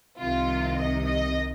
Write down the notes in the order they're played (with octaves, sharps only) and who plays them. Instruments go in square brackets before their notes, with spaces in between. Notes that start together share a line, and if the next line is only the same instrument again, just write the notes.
[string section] C2 C3 D#3 F4
D#5
D#5